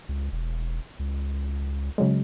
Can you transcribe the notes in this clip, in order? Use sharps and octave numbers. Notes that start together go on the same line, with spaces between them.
C#2
E1
C#2
C#3 F#3 G#3